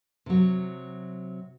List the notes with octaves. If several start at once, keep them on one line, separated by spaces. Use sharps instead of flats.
C3 F#3